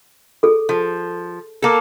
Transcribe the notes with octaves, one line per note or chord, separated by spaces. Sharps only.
G#4 A4
F3
A#3 A4